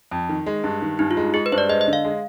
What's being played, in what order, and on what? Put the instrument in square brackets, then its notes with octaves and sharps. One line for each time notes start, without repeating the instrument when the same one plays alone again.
[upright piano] F2
D#3
G#3
G2
D#3
[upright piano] G2 [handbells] D#4
[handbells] F4
[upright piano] G#3
[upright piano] G#3 [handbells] G#4
[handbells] B4
[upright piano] G2 [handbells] C5
[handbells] D5
[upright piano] G#3 [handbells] D#5
[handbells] D#5
[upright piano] D3
[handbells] F5
[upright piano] G#3